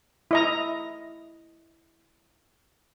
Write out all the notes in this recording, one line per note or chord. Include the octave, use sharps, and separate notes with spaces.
E4 D#5 A#5